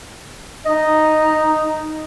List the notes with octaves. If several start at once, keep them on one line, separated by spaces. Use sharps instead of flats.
D#4 D#5